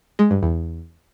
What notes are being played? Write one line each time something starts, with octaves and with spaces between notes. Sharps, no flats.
G#3
G2
E2